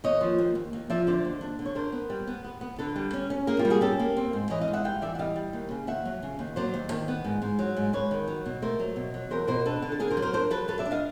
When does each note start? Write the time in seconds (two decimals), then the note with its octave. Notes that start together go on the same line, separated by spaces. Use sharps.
0.04 D#2 C#5 D#5
0.21 F3
0.38 D#2
0.55 D#2
0.73 D#2
0.90 F3 D5 E5
1.07 D3 C5 D5
1.25 D#2
1.41 D4
1.59 D3
1.66 C#5
1.75 D4 A#4 C5
1.92 B3
2.10 G3
2.27 B3
2.44 B3
2.61 B3
2.79 D3 A4 B4
2.96 G3
3.13 C#4
3.30 C#4
3.47 A#3 G#4 A#4
3.59 F4 G4
3.65 G3
3.70 F#4 G#4
3.81 C#4 G4 A4
3.99 A#3
4.17 C4
4.33 G#2
4.50 E3 C#5 D#5
4.61 D#5 F5
4.68 G#2
4.73 E5 F#5
4.84 G3 F5 G5
5.02 E3 D5 E5
5.15 F#5
5.19 G3 D#5 F5
5.36 G3
5.53 D#2
5.71 C#3
5.87 D#2 E5 F#5
6.05 F#3
6.23 C#3
6.39 D#2
6.56 F#3 C5 D5
6.74 D#2
6.91 D#3
7.08 B3
7.25 G#2
7.42 G#2
7.59 F#3
7.77 G#2
7.93 G#2 B4 C#5
8.11 D#3
8.28 F#3
8.46 B2
8.62 A3 A#4 C5
8.79 F#3
8.96 B2
9.14 F#3
9.31 E2 A#4 C5
9.47 B2 A#4 C5
9.65 D4 A4 B4
9.82 D3
9.92 A4
10.00 D3 G#4 A#4
10.10 A#4 C5
10.17 F#3
10.22 A#4 C5
10.33 D4 A#4 C5
10.51 F#3 A4 B4
10.68 F#3 A4 B4
10.79 D5 E5
10.86 D4
10.91 D#5 F5